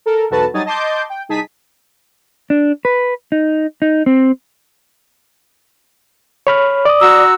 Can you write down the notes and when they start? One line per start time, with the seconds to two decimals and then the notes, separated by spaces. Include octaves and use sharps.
0.06 A4 A#4
0.30 B1 E2 F#4 A4 B4 A5
0.53 F#3 G3 D#4 G#5 D#6 A6
0.66 D#5 A5 C6 D6 G6
1.10 G5
1.29 C2 D#4 G#4 A5 B6 D#7
2.50 D4
2.85 B4
3.32 D#4
3.82 D#4
4.06 C4
6.47 C#5 B5 F6
6.85 D5 D6 D#6
7.01 F#4 A#5 E6